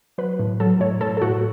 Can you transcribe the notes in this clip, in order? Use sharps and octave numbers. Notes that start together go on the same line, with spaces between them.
F#3 B4
A2
F#3 A4
A2 C#5
A2 A4
A4
A2 F#4